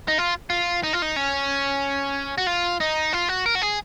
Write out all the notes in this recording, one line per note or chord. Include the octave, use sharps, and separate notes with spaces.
D#4
F4
F4
D#4
F4
D#4
C#4
F#4
F4
D#4
F4
F#4
A#4
F#4
G#4